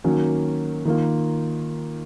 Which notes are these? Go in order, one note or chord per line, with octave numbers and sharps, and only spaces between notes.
D#3 F#3 A#3 C#4
D#3 A#3 F4